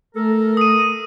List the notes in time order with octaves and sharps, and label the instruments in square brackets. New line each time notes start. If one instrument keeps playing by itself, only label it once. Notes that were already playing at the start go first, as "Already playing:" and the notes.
[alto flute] A3 [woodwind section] A4 A#4
[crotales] D#6 D#7